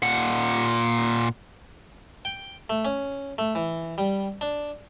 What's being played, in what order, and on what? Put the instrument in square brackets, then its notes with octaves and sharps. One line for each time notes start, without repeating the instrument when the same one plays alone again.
[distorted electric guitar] A#2 F#5
[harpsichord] G5
A3
C#4
A3
E3
G3
D4